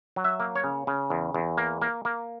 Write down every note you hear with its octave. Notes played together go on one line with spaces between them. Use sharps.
F#3
E5
A#3
C#5
C#3
C#3
E2
E2
A#3
A#3
A#3